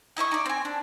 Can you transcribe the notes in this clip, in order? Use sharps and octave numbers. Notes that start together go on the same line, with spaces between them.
D#4 E4 D#5 C#6
D#4 D5
C4 G#5
D4